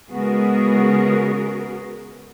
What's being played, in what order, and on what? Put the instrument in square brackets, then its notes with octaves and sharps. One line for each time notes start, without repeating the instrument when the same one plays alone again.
[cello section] C#3 G#3 B3 F#4 G#4 A#4